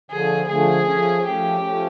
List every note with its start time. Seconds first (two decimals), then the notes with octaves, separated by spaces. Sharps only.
0.10 D3 F3 A3 G#4
0.48 D3 F3 A3 G#4
0.87 F3 A3 C#4
1.26 F3 A3 C#4 G4
1.65 F3 A3 C#4